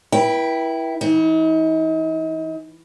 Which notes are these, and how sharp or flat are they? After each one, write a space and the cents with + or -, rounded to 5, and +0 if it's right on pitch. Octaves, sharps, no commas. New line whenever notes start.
E4 +0 B4 -40 G5 +0
E3 +5 D#4 +40